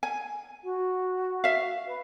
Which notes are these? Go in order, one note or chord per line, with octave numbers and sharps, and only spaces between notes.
G#5
F#4
E5 F5
B4